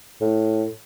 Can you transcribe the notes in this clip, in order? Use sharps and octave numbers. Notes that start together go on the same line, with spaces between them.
A2